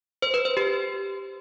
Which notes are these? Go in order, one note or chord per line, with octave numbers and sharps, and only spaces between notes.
C5
B4
C5
G4